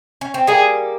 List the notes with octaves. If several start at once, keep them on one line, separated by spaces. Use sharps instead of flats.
C#4
C4
G3 A#3 G#4